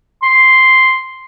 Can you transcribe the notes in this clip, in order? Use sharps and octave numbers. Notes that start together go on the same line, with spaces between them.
C6